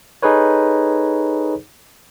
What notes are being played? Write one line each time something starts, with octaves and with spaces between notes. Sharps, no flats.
D#4 G#4 A4 B4 C#5